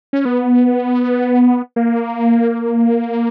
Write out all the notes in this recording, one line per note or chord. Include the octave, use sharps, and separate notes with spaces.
C#4
B3
A#3